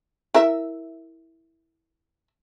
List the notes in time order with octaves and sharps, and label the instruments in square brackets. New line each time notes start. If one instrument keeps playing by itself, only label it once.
[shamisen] E4 A#4 E5